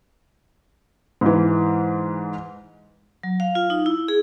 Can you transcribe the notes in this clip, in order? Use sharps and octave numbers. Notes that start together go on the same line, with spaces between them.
G#2 E3
F#3
F5
F4
D#4
E4
G#4